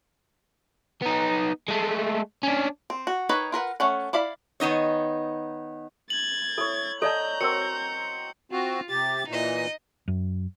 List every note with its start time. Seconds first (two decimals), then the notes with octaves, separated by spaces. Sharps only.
1.02 B3 D#4
1.68 G#3 A3
2.43 C#4 D4
2.90 C4
3.07 F#4
3.29 D#3 D#4 B4 C#5 D#5
3.52 F4 A#4 B4 F#5
3.80 A3 C#4 F#5
4.13 E4 D5 F5 B5
4.60 D#3 B3 D#4 C#5
6.10 G#6 A6 F#7
6.58 E4 A4 C#5
7.02 A4 D5 D#5 G5 A5 A#5 E6 G6
7.41 F#3 C4 A#4 E6 C#7
8.52 C4 F4 F#4
8.90 C3 G4 A6
9.28 A#2 E3 D#4 D#5
10.08 F#2